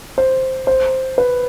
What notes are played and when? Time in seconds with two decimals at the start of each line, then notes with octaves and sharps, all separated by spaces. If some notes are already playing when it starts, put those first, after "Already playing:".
0.18 C5
0.67 C5
1.18 B4